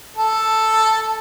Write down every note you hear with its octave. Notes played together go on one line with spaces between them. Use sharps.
A4